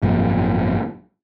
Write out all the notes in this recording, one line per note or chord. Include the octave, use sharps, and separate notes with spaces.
G#1 F#2 A#2 F3